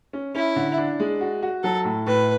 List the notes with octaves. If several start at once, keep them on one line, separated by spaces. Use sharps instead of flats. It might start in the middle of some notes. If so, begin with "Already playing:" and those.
C#4
C#4 E4
D3
D4
G#3
F#4
F#4
F#3 A4
A2
A2 B4